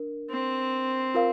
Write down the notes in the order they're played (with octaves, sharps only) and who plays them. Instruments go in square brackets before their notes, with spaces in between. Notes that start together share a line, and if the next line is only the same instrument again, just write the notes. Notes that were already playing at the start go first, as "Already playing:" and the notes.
Already playing: [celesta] D4 A#4
[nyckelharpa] C4
[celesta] F4 A#4 F5